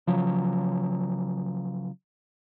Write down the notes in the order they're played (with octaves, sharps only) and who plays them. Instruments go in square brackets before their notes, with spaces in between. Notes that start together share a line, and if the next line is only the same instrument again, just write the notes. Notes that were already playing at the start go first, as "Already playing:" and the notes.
[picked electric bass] C#3 F3 F#3